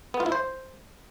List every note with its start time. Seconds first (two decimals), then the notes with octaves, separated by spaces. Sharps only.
0.14 B3
0.20 F4
0.26 E4
0.32 C5